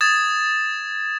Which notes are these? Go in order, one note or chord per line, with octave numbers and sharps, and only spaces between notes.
D#6 G#6 A6 E7